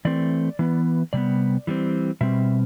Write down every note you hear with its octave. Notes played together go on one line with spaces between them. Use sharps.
E3 A3 C4 D5
E3 B3
C3 G3 B3 D5
E3 G3 C4
B2 G3 C4 E5